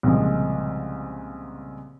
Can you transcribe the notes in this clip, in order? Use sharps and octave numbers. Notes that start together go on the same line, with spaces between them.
C2 A#2 C#3 F3 G#3